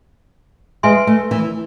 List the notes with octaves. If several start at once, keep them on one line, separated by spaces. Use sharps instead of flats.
G#3 B4 E5 G#5 C6
A3
E3